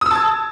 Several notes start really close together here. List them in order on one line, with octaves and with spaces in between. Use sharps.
D#6 E6 A5 G#6